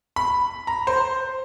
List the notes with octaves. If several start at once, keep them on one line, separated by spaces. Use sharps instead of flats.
B5
A#5
C5